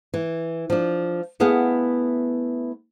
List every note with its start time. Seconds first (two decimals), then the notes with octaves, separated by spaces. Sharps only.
0.14 E3
0.70 F3 D4
1.40 A3 B3 E4 G#4 F5 F#5